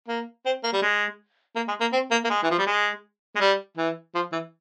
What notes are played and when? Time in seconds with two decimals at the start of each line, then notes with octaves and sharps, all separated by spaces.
0.08 A#3
0.45 C4
0.63 A#3
0.73 G3
0.82 G#3
1.56 A#3
1.68 G#3
1.80 A#3
1.93 C4
2.11 A#3
2.24 A#3
2.30 G#3
2.43 E3
2.50 F3
2.58 G3
2.66 G#3
3.36 G#3
3.40 G3
3.77 E3
4.15 F3
4.32 E3